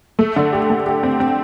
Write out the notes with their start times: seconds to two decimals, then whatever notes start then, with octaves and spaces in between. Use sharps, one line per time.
0.19 A3
0.36 D3
0.53 G4
0.70 A3
0.86 G4
1.03 C4
1.20 C4